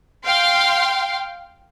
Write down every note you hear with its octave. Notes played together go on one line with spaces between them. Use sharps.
F5 G5 C6